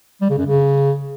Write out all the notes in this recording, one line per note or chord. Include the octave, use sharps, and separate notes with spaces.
G3
C#3
F#2
C#3